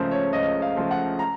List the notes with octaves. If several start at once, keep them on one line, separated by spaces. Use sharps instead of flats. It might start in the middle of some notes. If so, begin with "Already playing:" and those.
Already playing: C#2 C#3 F3 A3 A#4 C5
C#5
C#2 D#5
F5
C#3 F3 A3
F#5
A#5